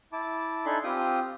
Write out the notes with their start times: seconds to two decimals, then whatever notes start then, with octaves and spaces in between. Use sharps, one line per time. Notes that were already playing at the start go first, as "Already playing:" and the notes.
0.13 E4 A5 D6
0.66 D4 D#4 A4 G#5 B5 C6
0.84 C4 F4 G4 G5 D#6